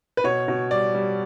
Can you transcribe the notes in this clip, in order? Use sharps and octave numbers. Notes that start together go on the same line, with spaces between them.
B4
B2 C#5
B2
G3 D5
G3